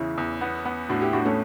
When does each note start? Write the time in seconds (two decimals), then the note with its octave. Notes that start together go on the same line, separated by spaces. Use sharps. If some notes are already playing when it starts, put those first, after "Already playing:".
Already playing: E2 C#3 E3 C#4 E4
0.18 E2
0.41 B3
0.65 B3
0.89 A2 D4 F#4
1.01 E4 G4
1.13 A2 D4 F#4
1.25 A3 C#4